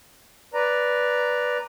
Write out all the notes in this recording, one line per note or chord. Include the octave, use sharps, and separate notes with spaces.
B4 D5 A#5